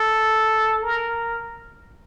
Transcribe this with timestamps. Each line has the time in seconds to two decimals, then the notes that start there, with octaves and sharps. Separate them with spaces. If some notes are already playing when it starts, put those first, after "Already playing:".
Already playing: A4
0.83 A#4